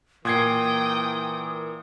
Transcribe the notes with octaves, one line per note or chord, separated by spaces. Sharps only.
A#2 E3 A#4 G5 D#6 G#6 C7